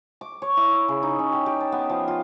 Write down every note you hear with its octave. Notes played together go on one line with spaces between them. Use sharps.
D6
C#5
E4
C#3
D#4
C#4
G4
G4
A5
B3
F3
F4